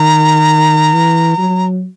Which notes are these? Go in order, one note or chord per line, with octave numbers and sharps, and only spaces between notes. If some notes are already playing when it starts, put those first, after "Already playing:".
Already playing: D#3 A#5
E3
F#3